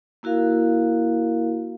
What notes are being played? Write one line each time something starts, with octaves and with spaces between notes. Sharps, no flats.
A#3 E4 F#4 A#4 F5